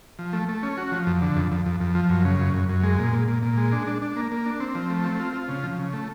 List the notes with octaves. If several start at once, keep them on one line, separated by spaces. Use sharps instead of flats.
F3
A3
A3
C#4
F#4
F3
F2
D3
F2
F2
F2
F2
F3
F#2
C#3
F#2
F#2
F#2
G#3
A#2
A#2
A#2
A#2
G#3
D4
D4
D4
A#3
A#3
D4
C4
F3
A3
C4
F4
F4
C#3
F3
C#3
A3